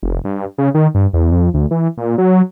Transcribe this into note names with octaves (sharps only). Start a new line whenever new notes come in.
F1
G2
C#3
D#3
G2
E2
F2
D2
E3
A#2
F#3